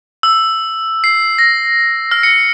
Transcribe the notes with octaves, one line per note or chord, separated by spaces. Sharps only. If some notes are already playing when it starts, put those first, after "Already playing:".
E6
C7
A#6
F6
C#7